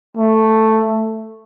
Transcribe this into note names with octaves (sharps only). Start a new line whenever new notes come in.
A3